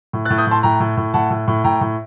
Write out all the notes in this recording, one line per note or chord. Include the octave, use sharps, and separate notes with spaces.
A2
F#6 A6
A2
D#6 G6
A2 A5 C6
A2 G5 A#5
A2
A2
A2 F#5 A5
A2
A2
A2 G5 A#5
A2